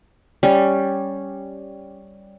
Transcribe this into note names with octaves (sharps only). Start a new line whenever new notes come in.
G3 C#4